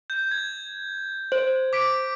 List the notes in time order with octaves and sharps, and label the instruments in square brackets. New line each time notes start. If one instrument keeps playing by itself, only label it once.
[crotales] G6
G#6
[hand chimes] C5
[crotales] D6 B6 D7